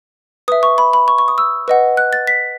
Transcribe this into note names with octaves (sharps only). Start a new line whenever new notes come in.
B4 E5 D#6
C#6
B5
B5
C#6
C#6
D#6
E6
B4 D#5 F#5
F#6
A6
B6